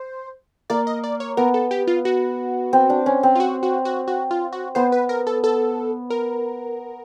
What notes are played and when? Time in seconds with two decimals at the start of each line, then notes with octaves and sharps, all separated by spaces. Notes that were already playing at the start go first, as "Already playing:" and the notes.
Already playing: C5
0.70 A#3 D5
0.87 D#5
1.04 D5
1.20 C#5
1.37 B3 A#4
1.54 A4
1.71 G4
1.87 F4
2.05 F#4
2.73 C4
2.90 D4
3.06 C#4
3.23 C4
3.35 F4
3.40 F#4
3.63 F#4
3.85 F#4
4.08 F#4
4.31 F4
4.53 F#4
4.75 B3 C5
4.92 B4
5.09 A#4
5.27 A4
5.44 A4
6.10 A#4